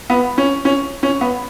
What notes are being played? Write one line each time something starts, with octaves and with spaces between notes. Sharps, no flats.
B3
C#4
C#4
C#4
B3